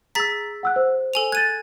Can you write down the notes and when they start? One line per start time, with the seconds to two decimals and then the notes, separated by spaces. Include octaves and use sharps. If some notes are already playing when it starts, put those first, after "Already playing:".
0.15 G#4 A#5 E6 A6 B6
0.63 F#5 E6 F#6
0.76 C5
1.14 A4 G#5 F7
1.32 F#6 G#6 A6 D#7